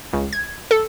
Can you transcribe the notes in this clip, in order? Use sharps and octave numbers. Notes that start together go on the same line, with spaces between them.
C#2
G#6
A4